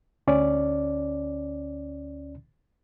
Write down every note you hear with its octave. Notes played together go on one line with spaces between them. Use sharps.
D2 C#4 D5